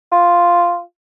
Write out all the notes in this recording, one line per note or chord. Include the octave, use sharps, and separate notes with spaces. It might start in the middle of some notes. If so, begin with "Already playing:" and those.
F4